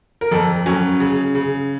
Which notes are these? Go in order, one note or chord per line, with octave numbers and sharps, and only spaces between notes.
A#4
F2 A4
F#3 C#4
C#3
C#3